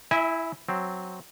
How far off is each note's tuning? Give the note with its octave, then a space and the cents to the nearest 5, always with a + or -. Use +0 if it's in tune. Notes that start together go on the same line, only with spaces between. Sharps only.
E4 +0 E5 -35 G#5 -15
F#3 +0 C4 +0